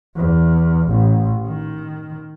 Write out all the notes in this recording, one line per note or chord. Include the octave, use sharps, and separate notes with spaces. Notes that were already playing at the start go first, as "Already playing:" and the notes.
E2
A1
D#3